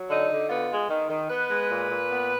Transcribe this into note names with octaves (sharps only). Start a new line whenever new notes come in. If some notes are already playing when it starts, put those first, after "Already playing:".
Already playing: F#3
D3 D#4
D3
B3 F4
G#3
D#3
D#3
B3 B4
G#3
A#2
A#2
B3